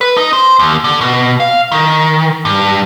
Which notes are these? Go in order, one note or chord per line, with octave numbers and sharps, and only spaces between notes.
B4
D#4
C5
D#2
D3
B2
F5
D#3
G2